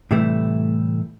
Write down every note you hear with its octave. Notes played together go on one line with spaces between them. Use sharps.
A2 C3 E3 G3 A3 E4